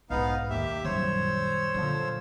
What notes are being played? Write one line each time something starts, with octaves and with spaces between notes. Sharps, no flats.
B1 G#2 B3 D#4 F5
D#2 A#3 G4 E5
A#1 F#2 D#3 G3 C5 C#5 E6
A#2 D3 F3 F#3